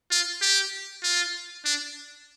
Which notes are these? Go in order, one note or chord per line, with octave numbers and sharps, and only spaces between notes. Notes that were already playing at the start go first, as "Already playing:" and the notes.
F4
G4
F4
D4